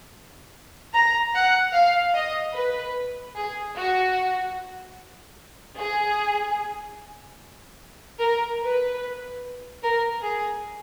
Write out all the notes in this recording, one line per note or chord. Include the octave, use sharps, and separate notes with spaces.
A#5
F#5
F5
D#5
B4
G#4
F#4
G#4
A#4
B4
A#4
G#4